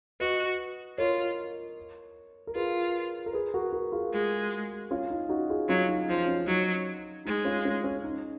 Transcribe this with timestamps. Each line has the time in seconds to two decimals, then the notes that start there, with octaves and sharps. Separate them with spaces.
0.20 F#4 B4 D#5
0.98 F4 A#4 C#5
2.47 A#4
2.55 F4 G#4 B4
3.26 A#4
3.33 G#4 B4
3.54 F#4 A#4
3.73 F#4 A#4
3.92 F4 G#4
4.12 G#3
4.91 C#4 F4
5.10 D#4
5.29 D#4 F#4
5.50 F4 G#4
5.69 F#3 C#4 F4
5.89 D#4
6.08 F3 D#4
6.27 C#4
6.47 F#3 D#4
7.25 G#3 D#4
7.45 C#4 F4
7.65 C#4
7.84 C#4
8.04 D#4